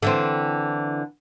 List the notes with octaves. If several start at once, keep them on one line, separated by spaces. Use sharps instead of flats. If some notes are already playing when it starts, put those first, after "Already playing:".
D3 E3 C4